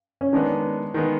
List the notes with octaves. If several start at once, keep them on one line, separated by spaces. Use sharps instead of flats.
C#4
D#3 G#3 B3 D4
D#3 G#3 B3